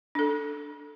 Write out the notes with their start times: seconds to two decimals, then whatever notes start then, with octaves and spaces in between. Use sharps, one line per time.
0.15 D4 A4